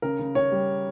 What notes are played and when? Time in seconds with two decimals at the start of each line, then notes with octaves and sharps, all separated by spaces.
0.02 C#3 A#4
0.19 C#3
0.35 C#3 C#5
0.52 G3